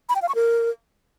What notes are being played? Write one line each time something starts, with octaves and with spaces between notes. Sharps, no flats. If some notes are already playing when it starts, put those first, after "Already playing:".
B5
G5
F5
C#6
A#4